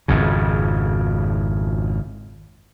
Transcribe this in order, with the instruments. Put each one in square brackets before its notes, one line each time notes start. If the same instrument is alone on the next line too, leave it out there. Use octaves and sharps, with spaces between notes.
[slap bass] G#1 F2 C#3